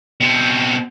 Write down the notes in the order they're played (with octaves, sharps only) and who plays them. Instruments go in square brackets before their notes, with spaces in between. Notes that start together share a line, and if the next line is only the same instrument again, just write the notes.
[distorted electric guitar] B2 C4